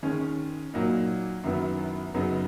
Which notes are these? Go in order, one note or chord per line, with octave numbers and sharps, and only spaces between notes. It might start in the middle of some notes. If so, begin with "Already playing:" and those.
D#3 G#3 C#4
A#2 F#3 A#3 D#4
F#2 D#3 F#3 B3 E4
F#2 C#3 F#3 B3 D#4